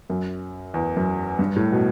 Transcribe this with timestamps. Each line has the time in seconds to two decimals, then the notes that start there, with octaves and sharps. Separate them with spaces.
0.10 F#2
0.74 E2
0.97 F#2
1.39 G2
1.56 A2
1.72 B2